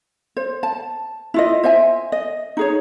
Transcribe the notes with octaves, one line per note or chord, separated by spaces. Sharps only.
C5
A5
E4 F4 D#5
C5 D#5 E5 G#5
D#5
D#4 G#4 C#5